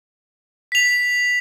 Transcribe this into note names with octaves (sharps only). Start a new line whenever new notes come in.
B6 F7